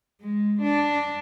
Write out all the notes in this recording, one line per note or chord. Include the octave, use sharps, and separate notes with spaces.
G#3
D4